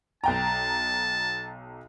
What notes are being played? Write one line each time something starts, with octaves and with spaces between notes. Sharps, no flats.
B1 G5 A5 A#5